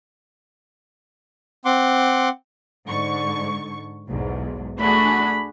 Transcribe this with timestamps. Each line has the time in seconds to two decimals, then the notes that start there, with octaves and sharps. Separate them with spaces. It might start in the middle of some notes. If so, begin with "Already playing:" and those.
1.65 C4 F#5 C6 D6
2.87 G#2 D3 C#6
4.08 B1 E2 G#2
4.80 A3 D4 F#4 G#4 B5